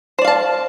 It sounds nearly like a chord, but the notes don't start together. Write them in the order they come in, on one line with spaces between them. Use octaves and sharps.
C5 D5 F5 A5